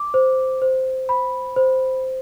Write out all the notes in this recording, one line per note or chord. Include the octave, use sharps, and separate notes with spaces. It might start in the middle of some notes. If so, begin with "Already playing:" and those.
Already playing: D6
C5
C5
B5
C5